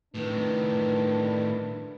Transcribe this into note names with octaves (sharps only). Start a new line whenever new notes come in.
A2 D#3 D4 B4